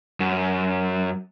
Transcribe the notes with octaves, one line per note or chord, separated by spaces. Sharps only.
F#2